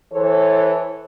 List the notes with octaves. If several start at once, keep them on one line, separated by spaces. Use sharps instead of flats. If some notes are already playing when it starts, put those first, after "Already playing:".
E3 A4 C5 C#5